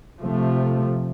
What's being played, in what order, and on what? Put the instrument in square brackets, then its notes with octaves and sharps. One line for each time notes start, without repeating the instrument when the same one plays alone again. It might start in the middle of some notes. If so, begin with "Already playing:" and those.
[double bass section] C3 F3 A3